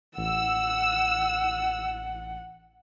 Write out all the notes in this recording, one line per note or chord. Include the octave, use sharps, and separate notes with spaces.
A1 F#5 E6